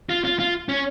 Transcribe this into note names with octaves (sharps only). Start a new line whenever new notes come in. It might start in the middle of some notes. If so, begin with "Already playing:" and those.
F4
F4
F4
C#4